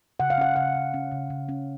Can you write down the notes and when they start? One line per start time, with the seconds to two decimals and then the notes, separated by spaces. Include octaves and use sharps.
0.20 C#3 F#5
0.30 F5
0.38 C#4 F#5
0.56 C#3 F#5
0.76 C#3
0.94 C#4
1.12 C#3
1.30 C#3
1.49 C#4